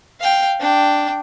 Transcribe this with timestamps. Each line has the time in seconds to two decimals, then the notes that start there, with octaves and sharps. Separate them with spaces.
0.20 F5 G5
0.60 D4 G5